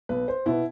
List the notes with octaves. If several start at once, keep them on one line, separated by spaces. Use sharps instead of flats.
B1 B4
C5
B2 B3 E4